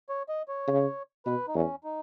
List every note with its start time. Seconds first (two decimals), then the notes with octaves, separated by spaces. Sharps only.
0.09 C#5
0.29 D#5
0.48 C#5
0.67 C#3
1.26 B2 B4
1.48 D#4
1.55 E2 C#4
1.84 D#4